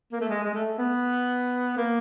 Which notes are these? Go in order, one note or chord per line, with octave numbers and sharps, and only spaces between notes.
A#3
A3
G#3
G#3
A3
B3
A#3